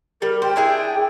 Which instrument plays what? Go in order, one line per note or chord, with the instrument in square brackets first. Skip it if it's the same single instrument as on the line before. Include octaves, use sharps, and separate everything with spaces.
[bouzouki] G3 [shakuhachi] A#4
[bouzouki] C5 [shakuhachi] G5
[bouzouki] D4 E4 G#4